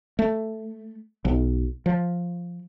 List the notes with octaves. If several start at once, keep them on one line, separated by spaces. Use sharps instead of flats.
A3
B1
F3